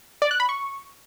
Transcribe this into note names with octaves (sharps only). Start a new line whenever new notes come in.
D5
F#6
B5
C#6